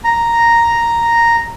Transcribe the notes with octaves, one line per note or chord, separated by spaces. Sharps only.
A#5